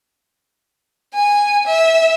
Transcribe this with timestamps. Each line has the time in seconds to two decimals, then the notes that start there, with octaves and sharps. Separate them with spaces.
1.15 G#5
1.67 E5